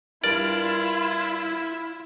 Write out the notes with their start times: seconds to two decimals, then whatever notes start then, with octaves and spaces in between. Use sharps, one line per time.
0.24 G2 E4 F4 A#4 D5